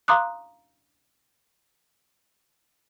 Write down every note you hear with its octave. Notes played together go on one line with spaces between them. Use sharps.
F5 A#5 C6 D6 D#6 F#6